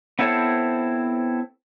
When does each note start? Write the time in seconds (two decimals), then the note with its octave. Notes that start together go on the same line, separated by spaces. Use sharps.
0.19 B3 C4 E4 A4 C5 C#5